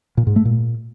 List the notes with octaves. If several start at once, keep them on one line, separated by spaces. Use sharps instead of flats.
A#2
G#2
A3
A#2